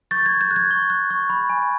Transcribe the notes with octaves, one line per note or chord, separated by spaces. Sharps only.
C#6 G6 A6
C#6 G#6
G6
F#6
G#6
C#6
F#6
C#6
B5
G#5